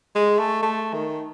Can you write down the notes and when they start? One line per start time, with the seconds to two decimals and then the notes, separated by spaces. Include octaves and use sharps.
0.15 G#3
0.39 A3
0.63 A3
0.93 D#3